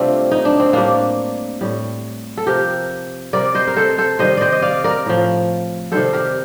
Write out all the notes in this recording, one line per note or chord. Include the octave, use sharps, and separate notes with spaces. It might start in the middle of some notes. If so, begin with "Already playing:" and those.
Already playing: C3 G3 A3 C4 D4 F4
D#4
D4
C4
A2 G3 A#3 D4
A2 G3
A4
C3 F3 G4 A#4
C3 G3 A#4 D5
C5 D#5
A#4
A4 C5
A4 C5
C3 D#3 G3 C5 D#5
C5 D5 D#5
D#5
D5 F5
A#4 D5
A2 F3
C3 D#3 G3 A4 C5
G4 A#4